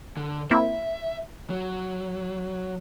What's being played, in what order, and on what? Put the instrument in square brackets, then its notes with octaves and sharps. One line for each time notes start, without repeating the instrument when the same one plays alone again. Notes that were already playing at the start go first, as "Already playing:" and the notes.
[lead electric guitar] D3
[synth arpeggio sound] A#3 C4 E4 [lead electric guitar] E5
[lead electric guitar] F#3